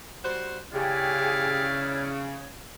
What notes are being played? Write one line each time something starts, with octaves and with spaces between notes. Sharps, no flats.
G3 F#4 C5
C#3 E4 G4 G#4 D5 F5 G5
C#5